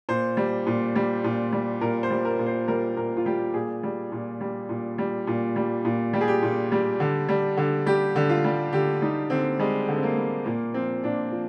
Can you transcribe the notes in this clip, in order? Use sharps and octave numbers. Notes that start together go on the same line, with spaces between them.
A#2 C5
G3
A#2
G3
A#2
G3
A#2 A#4
C5
G3
A#4
A#2
C5
G3 A#4
A#2 A#4
F4
G3 G4
A#2 G#4
G3
A#2
G3
A#2
G3
A#2
G3
A#2
G3 G4
G#4
G4
A#2
G3
D3
G3
D3
G3 G4
D3
F4
G3
D3 G4
G3 D#4
D3 C4
G3 G#3
D3
C4
A#3
G3
A#2 A#3
F3 C4
A#2 D4
F3